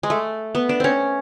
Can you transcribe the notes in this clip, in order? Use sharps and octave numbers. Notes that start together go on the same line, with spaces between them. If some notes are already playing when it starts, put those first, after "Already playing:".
G#3
A3
B3
D4
C4 C#4